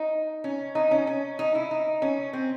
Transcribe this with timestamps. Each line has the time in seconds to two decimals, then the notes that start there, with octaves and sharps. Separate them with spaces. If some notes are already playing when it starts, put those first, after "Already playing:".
Already playing: D#4
0.44 C#4
0.75 D#4
0.91 C#4
1.07 C#4
1.39 D#4
1.55 E4
1.71 D#4
2.02 C#4
2.33 C4